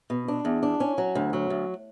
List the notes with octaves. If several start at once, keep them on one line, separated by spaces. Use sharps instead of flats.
B2
D4
E2
D4
C#4
F#3
D2
F#3
D2